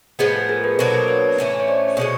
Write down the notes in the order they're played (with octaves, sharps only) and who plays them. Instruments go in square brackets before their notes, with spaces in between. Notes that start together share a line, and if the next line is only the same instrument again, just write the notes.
[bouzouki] A2 F3 G#3 B3
[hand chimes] A4
G#4 A#4
A4 B4
[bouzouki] B2 F#3 A#3 D4 [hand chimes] A#4 C5
[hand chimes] A#4 C5
B4 C#5
[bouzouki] A2 E3 A3 C#4
[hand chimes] C#5
C5 D5
[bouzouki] B2 G#3 C#4